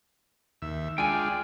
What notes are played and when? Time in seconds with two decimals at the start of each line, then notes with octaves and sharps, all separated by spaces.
0.62 D#2 E5
0.98 G#3 D4 F4 G5 G#5